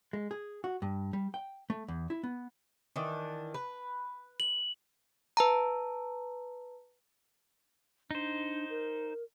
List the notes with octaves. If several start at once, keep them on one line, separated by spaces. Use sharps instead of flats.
G#3
G#4
F#4
G2
G3
G5
A3
E2
E4
B3
D#3 E3 D4
B4
F#7
B4 A5 A#5
D4 D#4 C5
A#4